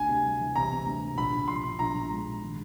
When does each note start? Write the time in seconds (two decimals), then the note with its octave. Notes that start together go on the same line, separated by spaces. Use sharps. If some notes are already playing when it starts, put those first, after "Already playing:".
Already playing: D2 G#5
0.09 C3
0.24 G3
0.40 E3
0.55 C3 A#5
0.71 C3
0.86 D2
1.01 C3
1.18 A#1 B5
1.32 A#1
1.48 F3 C6
1.63 A#1
1.79 A#1 A#5
1.94 A#1
2.11 G#2
2.25 A#1
2.41 D#3